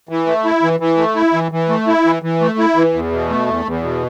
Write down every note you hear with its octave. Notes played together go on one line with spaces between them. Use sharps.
E3
A3
E4
E3
E3
A3
E4
E3
E3
A3
E4
E3
E3
A3
E4
E3
E2
B2
A3
E2
E2
B2